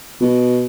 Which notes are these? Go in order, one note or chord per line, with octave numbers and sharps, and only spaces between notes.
B2